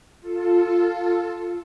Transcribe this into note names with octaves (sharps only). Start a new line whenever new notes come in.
F4 A4